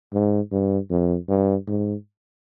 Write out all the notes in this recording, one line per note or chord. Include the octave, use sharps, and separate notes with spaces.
G#2
G2
F2
G2
G#2